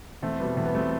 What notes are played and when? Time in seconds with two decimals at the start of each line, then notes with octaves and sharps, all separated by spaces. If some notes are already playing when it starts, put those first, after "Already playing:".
0.23 E2 A3 C4
0.39 B2 G3 B3
0.57 E2 A3
0.65 B3
0.75 B2 G3 A3 C4